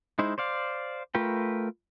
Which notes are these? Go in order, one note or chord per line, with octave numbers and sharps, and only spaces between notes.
G#3 D#4 E4 C5
C5 D5 F5
A3 F4 A#4 B4 G5